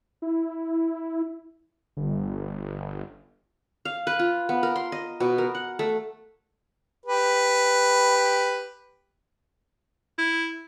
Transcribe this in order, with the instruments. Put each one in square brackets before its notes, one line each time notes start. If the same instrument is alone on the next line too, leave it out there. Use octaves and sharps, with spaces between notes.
[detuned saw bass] E4
G1
[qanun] F5
B4
F4
B3
A#4
C6
D#5
B2
A#4
F#5
A3
[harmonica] G4 B4
[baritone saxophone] E4